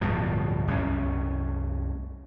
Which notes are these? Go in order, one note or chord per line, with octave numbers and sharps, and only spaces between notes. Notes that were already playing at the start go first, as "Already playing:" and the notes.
D1 G2 B2 F3
C2 F#2 G#3 C#4